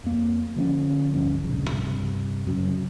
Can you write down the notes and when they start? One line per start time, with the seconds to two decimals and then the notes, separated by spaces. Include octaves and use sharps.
0.04 F2 A#3
0.56 D3 F3 A3 C#4
1.14 D1 G1 G2 C#4
1.44 D1 A#1 C#3
1.71 C2 G2
2.47 F#2 C#3